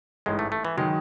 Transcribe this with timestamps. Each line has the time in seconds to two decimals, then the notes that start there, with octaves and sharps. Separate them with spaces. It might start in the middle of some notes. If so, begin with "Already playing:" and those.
0.26 A1 G#2 E3 G#3
0.39 A3
0.52 A3
0.65 E3
0.77 D#3 F#3 G#3